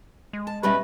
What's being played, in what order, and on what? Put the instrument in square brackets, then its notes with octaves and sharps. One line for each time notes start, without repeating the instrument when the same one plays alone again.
[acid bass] G#3
[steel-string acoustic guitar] A5
[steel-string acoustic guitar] B2 G3 C#4 [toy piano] G4 E5 [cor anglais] B4